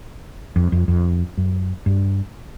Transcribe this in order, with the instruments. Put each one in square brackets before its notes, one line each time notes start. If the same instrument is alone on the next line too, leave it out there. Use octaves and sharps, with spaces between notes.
[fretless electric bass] F2
F2
F2
F#2
G2